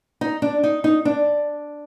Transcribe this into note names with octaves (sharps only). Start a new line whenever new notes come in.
D#4
D4
D#4
D#4
D4